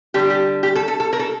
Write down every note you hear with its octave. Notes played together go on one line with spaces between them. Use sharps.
D3 G3 G4
G4
G4
A4
A4
A4
A#4
A4